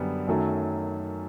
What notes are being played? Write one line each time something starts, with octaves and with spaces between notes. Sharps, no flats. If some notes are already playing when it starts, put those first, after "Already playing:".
Already playing: F#2 D3 G3 B3
F#2 D#3 F#3 A3